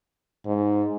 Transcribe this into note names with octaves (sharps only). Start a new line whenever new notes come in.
G#2